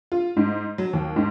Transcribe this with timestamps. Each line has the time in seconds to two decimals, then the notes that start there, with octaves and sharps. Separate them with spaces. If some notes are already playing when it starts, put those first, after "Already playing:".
0.12 F4
0.37 G#2
0.78 F#3
0.93 D#2
1.16 G#2